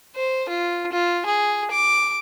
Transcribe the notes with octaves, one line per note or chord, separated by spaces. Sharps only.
C5
F4
F4
G#4
D6